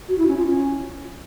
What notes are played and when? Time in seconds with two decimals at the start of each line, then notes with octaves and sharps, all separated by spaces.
0.08 F#4
0.18 E4
0.27 C#4
0.37 F4
0.46 C#4